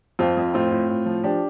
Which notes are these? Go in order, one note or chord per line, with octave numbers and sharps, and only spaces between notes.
F2 C4 F4
F2
A2 C4 F4
A2
A2
F3
F3 D4 G4